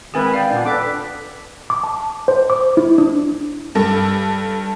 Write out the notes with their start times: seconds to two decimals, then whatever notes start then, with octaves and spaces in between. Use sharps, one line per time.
0.14 D#3 G#3 C4 G#4 B4 G#5 D#6
0.34 D5 F5 G5
0.51 A#2 B3 D4
0.65 D4 A4 B4 D5 D6
1.70 D6
1.84 A5
2.28 C5
2.50 D6
2.77 E4
2.98 D4
3.75 G2 A4